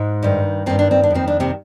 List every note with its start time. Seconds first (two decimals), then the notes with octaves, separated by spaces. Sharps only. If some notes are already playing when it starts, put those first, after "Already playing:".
Already playing: G#2 G#3
0.23 G2 D#3
0.66 G2 D#3 C4
0.79 D4
0.91 C4
1.03 D4
1.10 F2 D#3 C4
1.28 D4
1.40 C3 C4